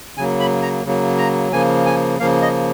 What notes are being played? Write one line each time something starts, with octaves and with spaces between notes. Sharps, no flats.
C#3 F#3 A#3 G#5
B5
A#5
C#3 F#3 A#3
A#5
C#3 F3 A#3 G#5
G#5
C#3 F3 A#3 F5
D#5